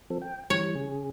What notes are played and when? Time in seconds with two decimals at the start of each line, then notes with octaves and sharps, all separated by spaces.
0.10 F3 C4 A4
0.22 G5
0.50 E3 G3 C#5
0.75 C#3 G#4